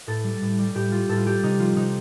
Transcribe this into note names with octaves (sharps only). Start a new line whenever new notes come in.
A2 A4
G3
A2
G3
A2 G4
G3 F4
A2 A4
F4
G3 G4
C3 D#4
F3 F4
C3 D#4